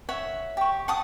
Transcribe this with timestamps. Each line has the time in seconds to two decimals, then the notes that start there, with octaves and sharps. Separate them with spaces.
0.09 C#5 E5 F#5
0.57 G4 C#6
0.88 F#5 A5 D#6